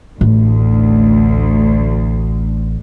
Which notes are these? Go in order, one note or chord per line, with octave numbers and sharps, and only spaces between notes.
A1 D2